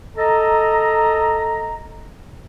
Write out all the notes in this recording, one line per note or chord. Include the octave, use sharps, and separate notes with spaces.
A4 D#5 A#5